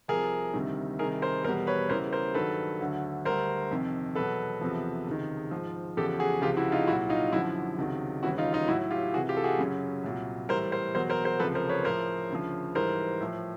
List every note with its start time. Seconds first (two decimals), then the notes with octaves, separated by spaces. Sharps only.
0.08 C2 C3 F3 G#4 A#4
0.54 D2 C3 D#3 G3
0.99 C2 C3 D#3 G3 G#4 A#4
1.22 A#4 C5
1.44 E2 B2 G3 A#4 C5
1.67 B4 C#5
1.89 E2 C#3 E3 G3 A#4 C5
2.12 A#4 C5
2.34 G2 D#3 F#3 A4 B4
2.80 D2 D3 F#3
3.25 D2 D3 G3 A#4 C5
3.71 F2 C3 D#3
4.15 E2 B2 F#3 A4 B4
4.61 E2 C3 F3
5.07 C#2 C3 D#3
5.51 G#2 F3
5.97 E2 C#3 F3 G4 A4
6.19 F#4 G#4
6.42 C#2 C3 F3 F4 G4
6.57 E4 F#4
6.72 D#4 F4
6.87 C2 A#2 F#3 E4 F#4
7.09 D#4 F4
7.32 F#2 E4 F#4
7.35 D3 F3
7.78 C#2 C3 D#3 F#3
8.23 D#2 C#3 E3 G3 E4 F#4
8.38 D#4 F4
8.53 D#4 F4
8.68 A2 F#3 E4 F#4
8.91 F4 G4
9.13 C2 C3 E3 F#4 G#4
9.29 F4 G4
9.37 A4
9.44 F#4 G#4
9.58 F#2 C#3 F#3
10.04 C2 A#2 F#3
10.49 A2 E3 G3 A#4 C5
10.72 A#4 C5
10.95 E2 B2 F#3 A#4 C5
11.10 A#4 C5
11.25 A#4 C5
11.40 C#2 C3 F3 A4 B4
11.55 A#4 C5
11.69 B4 C#5
11.85 A2 F3 A#4 C5
12.30 D2 C#3 F3
12.75 G#2 E3 G3 A#4 C5
13.21 A2 F3